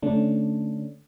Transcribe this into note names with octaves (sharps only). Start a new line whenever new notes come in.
D3 A3 C#4 D4